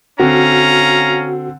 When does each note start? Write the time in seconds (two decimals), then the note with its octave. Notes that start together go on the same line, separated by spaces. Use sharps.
0.20 D3 C4 C#4 F#4 F5 A#5